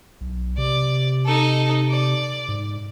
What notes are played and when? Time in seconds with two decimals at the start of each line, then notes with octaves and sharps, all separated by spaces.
0.21 B1
0.58 C3 D5
1.25 D#4 A4
1.89 D5
2.48 G#2